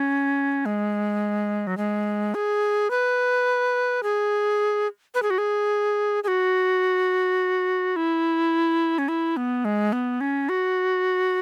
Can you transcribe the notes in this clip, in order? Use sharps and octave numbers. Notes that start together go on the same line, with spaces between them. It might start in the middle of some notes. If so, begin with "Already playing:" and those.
Already playing: C#4
G#3
F#3
G#3
G#4
B4
G#4
B4
G#4
F#4
G#4
G#4
F#4
E4
C#4
E4
B3
G#3
B3
C#4
F#4